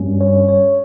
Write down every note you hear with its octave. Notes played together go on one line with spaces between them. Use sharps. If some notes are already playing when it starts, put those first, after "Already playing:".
Already playing: G2 G3 C#4
C#5
C#5